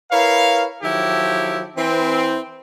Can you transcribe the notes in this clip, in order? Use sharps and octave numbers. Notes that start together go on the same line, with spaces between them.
E4 A#4 B4 C#5 F5
D#3 F3 F#3 E4 G4 A4
E3 C4